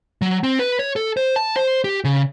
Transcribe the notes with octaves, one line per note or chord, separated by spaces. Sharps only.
F#3
C4
B4
C#5
A4
C5
A5
C5
G4
C#3